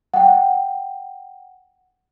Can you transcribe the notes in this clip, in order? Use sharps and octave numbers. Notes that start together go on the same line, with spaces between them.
F#5 G5